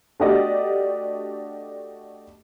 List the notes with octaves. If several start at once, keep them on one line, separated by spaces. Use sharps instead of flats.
A3 D4 F#4 G4 D5 D#5